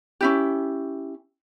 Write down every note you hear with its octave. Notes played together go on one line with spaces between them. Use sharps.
C#4 E4 G4